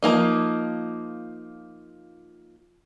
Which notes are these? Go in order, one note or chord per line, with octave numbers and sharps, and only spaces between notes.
F3 G#3 A#3 D#4